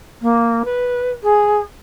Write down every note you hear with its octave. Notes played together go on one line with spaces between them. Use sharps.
A#3
B4
G#4